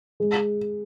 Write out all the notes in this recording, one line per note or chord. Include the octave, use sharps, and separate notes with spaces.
G#3